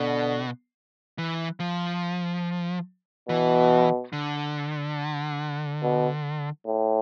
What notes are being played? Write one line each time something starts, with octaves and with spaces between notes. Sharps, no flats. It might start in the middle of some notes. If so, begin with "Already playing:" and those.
Already playing: B2 D3
E3
F3
B2 E3
D3
B2
A2